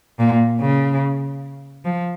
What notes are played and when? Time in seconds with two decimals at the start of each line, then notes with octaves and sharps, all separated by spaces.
0.19 A#2
0.60 C#3
1.85 F3